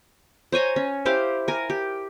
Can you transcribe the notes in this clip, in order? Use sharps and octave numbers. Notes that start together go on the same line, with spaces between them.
C5 C#5 G#5 A#5
C#4
E4 G4 C5 F5
A#4 G#5
G4